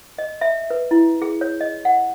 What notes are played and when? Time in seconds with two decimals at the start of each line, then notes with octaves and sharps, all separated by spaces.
0.18 D#5
0.41 E5
0.70 B4
0.91 E4
1.22 G#4
1.41 C#5
1.61 D#5
1.85 F#5